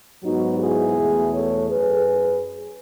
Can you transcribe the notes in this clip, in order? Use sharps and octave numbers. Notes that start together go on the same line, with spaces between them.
G#2 F#3 B3 D#4 F#4
E4 G#4
E2 B2 A3
A4 C#5
F#2 G#4 B4